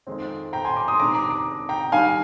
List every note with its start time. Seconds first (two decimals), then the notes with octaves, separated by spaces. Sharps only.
0.07 F2 D#3 G#3 C4
0.53 G5 A#5
0.65 G#5 C6
0.76 A#5 D6
0.88 C6 D#6
0.99 C3 D#3 G#3 D4 A#5 D6
1.15 A#5 D6
1.30 A#5 D6
1.69 G5 A#5
1.92 D#3 G3 D4 F5 G#5